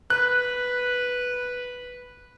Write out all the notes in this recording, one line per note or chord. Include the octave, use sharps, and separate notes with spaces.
B4 F#6